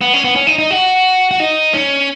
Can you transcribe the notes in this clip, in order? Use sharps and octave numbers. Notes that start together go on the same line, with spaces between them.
B3
C#4
B3
C#4
D#4
D#4
F#4
F#4
D#4
C#4